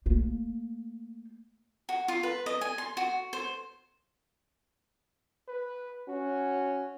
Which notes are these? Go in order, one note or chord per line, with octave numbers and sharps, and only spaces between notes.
A3 A#3
F#4
F4
B4
D#5
G#5
C6
F#4
C5
B4
C#4 F#4